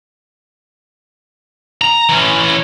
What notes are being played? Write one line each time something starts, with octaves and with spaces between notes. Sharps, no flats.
A#5
E3 C#4